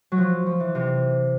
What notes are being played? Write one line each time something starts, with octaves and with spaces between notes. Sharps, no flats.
F#3
F3
F3
E3
C3